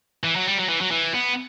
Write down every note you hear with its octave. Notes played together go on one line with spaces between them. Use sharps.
E3
F#3
G3
F#3
E3
F#3
E3
B3